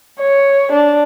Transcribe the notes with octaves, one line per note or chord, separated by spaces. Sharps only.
C#5
D4